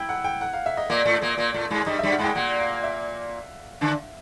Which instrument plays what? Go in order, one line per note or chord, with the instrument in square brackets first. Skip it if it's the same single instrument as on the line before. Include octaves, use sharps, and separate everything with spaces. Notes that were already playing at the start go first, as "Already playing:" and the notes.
Already playing: [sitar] E4 [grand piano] G5
[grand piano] F#5
G5
F#5
F5
E5
D#5
[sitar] A#2 A#3 [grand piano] D5
[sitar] A2 A3
A#2 A#3
A#2 A#3
A2 A3
G#2 G#3
[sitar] G2 G3 [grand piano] D#5
[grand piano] E5
[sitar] G2 G3
[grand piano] F#5
[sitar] G#2 G#3 [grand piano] G5
[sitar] A#2 A#3 [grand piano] F#5
[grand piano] F5
E5
[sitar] D3 D4